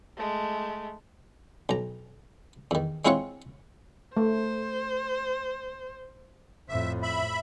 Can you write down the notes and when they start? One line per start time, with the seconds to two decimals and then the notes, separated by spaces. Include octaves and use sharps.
0.17 G#3 A3
1.69 B1 A#5
2.71 E2 D#3
3.05 G#3 C4 E4 F4 C#5 F#5
4.17 A3 C5
6.69 F2 A2 E5
7.03 E5 B5